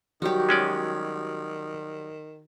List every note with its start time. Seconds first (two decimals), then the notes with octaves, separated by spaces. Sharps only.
0.22 D#3 F#3 G3 F#4 G4
0.49 G#3 C#4 D5